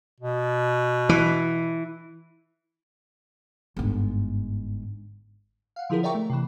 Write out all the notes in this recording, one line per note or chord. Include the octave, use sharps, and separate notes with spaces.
B2
E3
G1 G#2
F5 F#5
D3 F3 E4 G#4 A#4
C#5 D5 E5 G5 A#5 C#6
A3
C3 E3